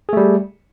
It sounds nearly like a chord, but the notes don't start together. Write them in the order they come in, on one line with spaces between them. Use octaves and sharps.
G#4 A3 G3